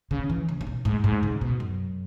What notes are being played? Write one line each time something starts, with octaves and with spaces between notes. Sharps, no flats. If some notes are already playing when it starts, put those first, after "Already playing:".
C#3
E3
C#3
C#3
B2
G#2
G#2
C#3
B2
F#2